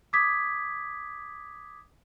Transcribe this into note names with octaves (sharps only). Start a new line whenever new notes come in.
D6 D#6 G#6 B6